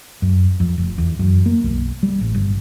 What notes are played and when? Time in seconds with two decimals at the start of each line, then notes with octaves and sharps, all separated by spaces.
0.22 F#2
0.60 F2
0.78 F1
0.98 E2
1.19 F#2
1.46 A#3
1.64 B1
2.03 G3
2.21 A1
2.34 G1